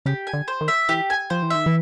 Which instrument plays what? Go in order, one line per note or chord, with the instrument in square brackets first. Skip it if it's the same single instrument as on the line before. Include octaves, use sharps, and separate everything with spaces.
[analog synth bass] C#3 [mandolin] G4
[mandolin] G#5
[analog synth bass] D3
[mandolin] C5
[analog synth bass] D#3
[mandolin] E5
[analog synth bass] E3 [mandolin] G4
[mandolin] G#5
[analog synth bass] F3 [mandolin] C5
[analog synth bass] E3
[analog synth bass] D#3 [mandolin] E5
[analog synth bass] E3